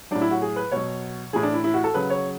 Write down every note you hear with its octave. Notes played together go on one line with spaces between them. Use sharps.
A2 F#3 D4
E4
F#4
G#4
B4
B2 F#3 C#5
A2 E3 G#4
D4
E4
E4
F#4
A4
C#3 F#3 B4
C#5